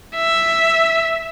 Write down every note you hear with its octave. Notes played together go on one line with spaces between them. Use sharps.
E5